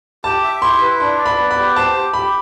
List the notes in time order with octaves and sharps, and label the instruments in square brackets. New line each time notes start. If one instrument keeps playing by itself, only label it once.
[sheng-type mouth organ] G4 [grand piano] A5
[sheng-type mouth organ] E5
[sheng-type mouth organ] E4 [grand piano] C6
[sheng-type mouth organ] B4
[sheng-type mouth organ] D4 [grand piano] C6
[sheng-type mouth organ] D5
[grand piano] B5
[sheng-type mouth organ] B3
[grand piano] B5
[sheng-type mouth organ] G4
[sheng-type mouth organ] C5 [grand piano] A5
[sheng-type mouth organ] G4
[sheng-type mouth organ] G4 [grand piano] B5